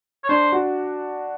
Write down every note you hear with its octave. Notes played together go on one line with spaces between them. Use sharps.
C#5
D4 C5
F#4